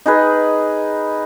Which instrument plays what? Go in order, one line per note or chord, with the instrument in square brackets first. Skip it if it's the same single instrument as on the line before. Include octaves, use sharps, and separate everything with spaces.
[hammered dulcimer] D#4 G#4 B4